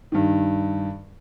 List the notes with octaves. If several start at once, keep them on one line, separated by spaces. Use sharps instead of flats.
G2 D#3